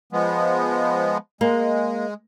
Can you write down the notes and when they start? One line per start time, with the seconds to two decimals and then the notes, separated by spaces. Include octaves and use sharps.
0.12 F3 G#3 B3
1.41 G#3 A#3